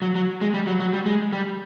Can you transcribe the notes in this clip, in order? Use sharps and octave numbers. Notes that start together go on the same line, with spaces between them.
F#3
F#3
G#3
G3
F#3
F#3
G3
G#3
G3